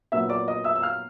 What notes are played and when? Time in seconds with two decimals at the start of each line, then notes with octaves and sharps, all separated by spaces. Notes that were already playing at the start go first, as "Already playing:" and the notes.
0.12 A#2 F#3 B3 E5 E6
0.29 D5 D6
0.48 D#5 D#6
0.64 E5 E6
0.76 E6
0.82 F5 F6